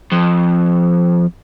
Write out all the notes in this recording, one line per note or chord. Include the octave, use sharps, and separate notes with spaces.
F2